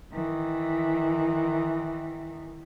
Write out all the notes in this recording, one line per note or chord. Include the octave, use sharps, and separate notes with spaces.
D#3 E3